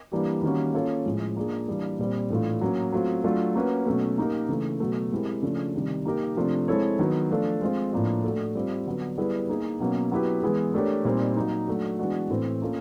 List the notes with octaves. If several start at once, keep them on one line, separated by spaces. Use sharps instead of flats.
E3 G3 A#3 D4 G4
D#3 G3 A#3 C#4 F#4
A#3 C#4 F4 A4 C#5
A2 F3 G#3
A#3 D4 F4 G#4
E3 G3 A#3 D4
A#2 G3 C4
A2 E3 A3 D4 F4
F#3 A#3 C#4
F#3 A3 C4 F4
F#3 A3 D4 F4
A#3 C#4 F#4 B4
B2 F#3 A3 C#4
A#3 D#4 G4 A#4
C#3 E3 A3
B2 F#3 A3
G#3 C4 E4 G4 A#4
C#3 F3 A3 D4
C3 D#3 G3
A#3 D#4 G4 A#4
C3 F3 A3 D4
G#3 C4 E4 A4 C#5
D#3 F#3 B3
F3 A3 D4 F4 A4
G#3 C4 F4
A2 F3 A#3 D4 F4
A3 D4 F#4 A4
G3 C4 F4
D3 F#3 B3 D4
G3 B3 E4 G#4 B4
A#3 D#4 G#4
B2 F#3 A#3 C#4
F#3 B3 E4 G4 B4
E3 G#3 B3 E4 G#4
A3 D4 G4 A#4 C#5
A#2 G3 C4 D#4
F#3 A#3 D#4
F#3 A3 D4 F#4
E3 G#3 B3 D4 F#4
A2 E3 A3 C4 E4
A#3 C#4 F4 A4